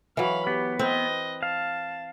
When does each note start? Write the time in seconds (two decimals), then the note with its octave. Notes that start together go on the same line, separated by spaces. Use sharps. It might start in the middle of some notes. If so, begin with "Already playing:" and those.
0.17 E3 F#3 F5 B5
0.47 B3 G4
0.79 C4 B4 D#5
1.43 F5 A5